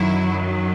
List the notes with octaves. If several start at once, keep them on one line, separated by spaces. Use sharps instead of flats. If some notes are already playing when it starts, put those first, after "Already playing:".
Already playing: F#2 D#3 F#3 E4